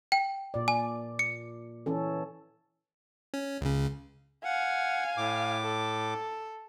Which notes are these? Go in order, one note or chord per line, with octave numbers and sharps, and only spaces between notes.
G5
A#2 D5
G#5
C#7
E3 C#4 A4
C#4
C#2 C#3
F5 F#5 G#5
A2 D6
A4